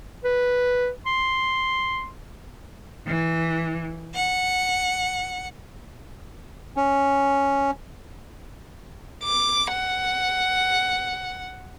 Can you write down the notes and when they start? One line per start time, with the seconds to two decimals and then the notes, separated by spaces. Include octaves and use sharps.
0.25 B4
1.06 C6
3.07 E3
4.15 F#5
6.76 C#4
9.24 D6
9.72 F#5